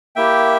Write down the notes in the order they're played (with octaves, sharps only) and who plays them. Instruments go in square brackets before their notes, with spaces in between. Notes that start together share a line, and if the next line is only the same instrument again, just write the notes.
[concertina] A#3 E4 G4 E5 G5